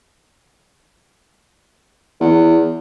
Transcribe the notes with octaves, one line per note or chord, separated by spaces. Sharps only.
E2